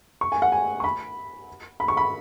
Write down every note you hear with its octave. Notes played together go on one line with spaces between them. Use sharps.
C#6
G#5
F#5
G#5
C#6
B5
B5
C#6
B5